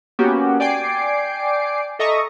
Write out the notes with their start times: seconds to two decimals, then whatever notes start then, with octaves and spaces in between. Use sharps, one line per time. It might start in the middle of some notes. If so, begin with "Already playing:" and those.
0.19 A#3 B3 C#4 F#4 G4
0.60 D5 G5 G#5 D6 C7 D7
1.99 A4 D#5 E5 A#5 C#6 D#6